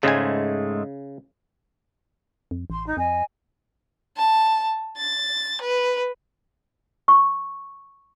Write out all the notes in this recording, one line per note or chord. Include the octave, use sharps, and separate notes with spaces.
G#2 C#3 G#3 A3 G#5
F2
A1 C6
D#4
F2 D#5 G#5
A5
A6
B4
C#6